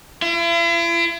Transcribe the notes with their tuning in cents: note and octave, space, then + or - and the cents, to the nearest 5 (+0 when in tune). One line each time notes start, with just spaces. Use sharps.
E4 +45